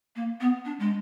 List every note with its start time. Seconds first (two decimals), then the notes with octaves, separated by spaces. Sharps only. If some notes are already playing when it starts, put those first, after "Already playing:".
0.16 A#3
0.41 B3
0.65 D4
0.80 G#3